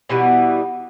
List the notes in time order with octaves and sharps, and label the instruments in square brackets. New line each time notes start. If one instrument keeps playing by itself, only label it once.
[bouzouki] B2 E3 G3 B3